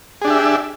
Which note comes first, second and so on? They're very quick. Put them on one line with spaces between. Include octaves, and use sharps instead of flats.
G#4 D4 G4 E5